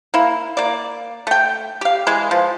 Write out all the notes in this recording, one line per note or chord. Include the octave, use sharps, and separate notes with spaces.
A#3 E4
A#3 D5
A3 G5
G4 F5
E3 G#3 G#4
F3